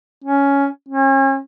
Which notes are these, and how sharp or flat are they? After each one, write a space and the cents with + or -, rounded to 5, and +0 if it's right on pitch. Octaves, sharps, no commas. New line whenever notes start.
C#4 +10
C#4 -40